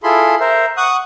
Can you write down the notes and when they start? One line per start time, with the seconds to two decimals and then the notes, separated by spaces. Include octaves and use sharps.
0.03 E4 F4 G#4 A4 B5 C6
0.40 A#4 C5 E5
0.77 F#5 C#6 D#6 F#6